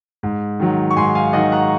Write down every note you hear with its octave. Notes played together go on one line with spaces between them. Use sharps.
G#2
D#3 F#3
C#6
G#2 G#5 C6
F5 G#5
D#3 F#3 D#5 F#5
F#5 A#5